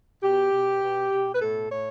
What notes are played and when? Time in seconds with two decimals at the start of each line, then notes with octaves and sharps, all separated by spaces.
0.23 B2 G4
0.52 B2
0.82 B2
1.11 B2
1.34 B4
1.40 A2 A4
1.70 A2 C#5